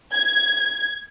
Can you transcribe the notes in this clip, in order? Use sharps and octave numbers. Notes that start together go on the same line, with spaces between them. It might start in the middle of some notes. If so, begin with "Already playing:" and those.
G#6